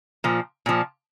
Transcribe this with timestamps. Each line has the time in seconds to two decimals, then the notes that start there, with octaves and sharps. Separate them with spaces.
0.24 A#2 F3
0.66 A#2 F3